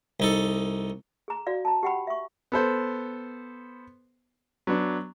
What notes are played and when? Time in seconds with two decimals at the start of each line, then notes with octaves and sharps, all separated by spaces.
0.20 C2 D#4 A4
1.28 G#4 A#5
1.47 F#4 D5 F5
1.65 A5 A#5
1.83 G4 F#5 G5 B5
2.07 E5 C#6
2.52 B3 A4 C5
4.67 F#3 B3 D4